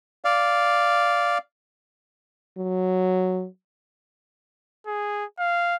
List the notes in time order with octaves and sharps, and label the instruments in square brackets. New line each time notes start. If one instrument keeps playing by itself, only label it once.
[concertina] D5 F5
[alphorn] F#3
[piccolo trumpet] G#4
F5